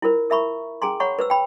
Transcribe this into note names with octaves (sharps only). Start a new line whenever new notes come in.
E4 F4 A#4 C5
A#4 E5 A#5 B5 C#6
C#4 G#4 G#5 A#5 C6
C#5 F#5 A#5 B5 C#6
B4 C5 E6
G5 B5